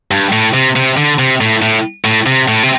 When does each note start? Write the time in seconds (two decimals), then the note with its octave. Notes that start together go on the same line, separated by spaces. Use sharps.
0.11 G2
0.32 A2
0.54 C3
0.76 C3
0.97 D3
1.19 C3
1.41 A2
1.62 A2
2.05 A2
2.26 C3
2.48 A2
2.63 C3